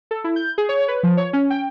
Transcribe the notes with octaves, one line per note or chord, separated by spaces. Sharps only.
A4
E4
G6
G#4
C#5
B4
F3
C#5
C#4
G5